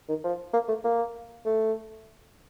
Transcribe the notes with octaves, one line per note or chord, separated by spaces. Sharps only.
D#3
F3
A#3
A3
A#3
A3